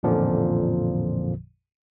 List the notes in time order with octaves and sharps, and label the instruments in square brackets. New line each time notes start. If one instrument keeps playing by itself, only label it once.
[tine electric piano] A1 F2 A#2 D3 F3